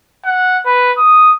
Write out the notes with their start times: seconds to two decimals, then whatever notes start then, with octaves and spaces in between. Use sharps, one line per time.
0.25 F#5
0.66 B4
0.98 D#6